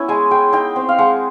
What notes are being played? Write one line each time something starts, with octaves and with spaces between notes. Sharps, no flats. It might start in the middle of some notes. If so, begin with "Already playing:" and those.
Already playing: B3 C#4 E4
G#3 G#5
G#3 G5
D#4 G5
C4
F5
G#3 F#5